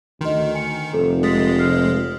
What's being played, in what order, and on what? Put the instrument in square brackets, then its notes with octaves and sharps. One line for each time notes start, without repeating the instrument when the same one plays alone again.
[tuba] D2 [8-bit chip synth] D#3 [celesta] D#5 C6
[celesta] G#5 C#7
[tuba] F1 [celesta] A4
[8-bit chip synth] G#3 [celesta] D#6 A6 B6
[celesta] F6 C7